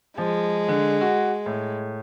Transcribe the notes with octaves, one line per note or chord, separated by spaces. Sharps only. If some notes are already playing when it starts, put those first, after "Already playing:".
F3 G#3
D3
F#4
A2